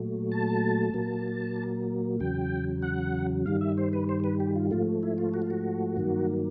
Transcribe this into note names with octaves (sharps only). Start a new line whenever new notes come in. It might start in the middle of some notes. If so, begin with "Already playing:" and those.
Already playing: A#2 F#3 A3
A5
A#2 F#3 A#3
E2 C#3 F#3 G5
F#5
G2 D#3 G3 F5
E5
C5
B4
C5
B4
G4
F4
G#2 F3 A3 F4
E4
F4
F#4
F4
F#4
G2 D#3 F#3 A#3